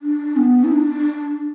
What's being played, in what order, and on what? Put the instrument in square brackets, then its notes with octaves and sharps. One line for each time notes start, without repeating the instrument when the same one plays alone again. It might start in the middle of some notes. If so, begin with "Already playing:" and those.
[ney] D4
B3
E4
D4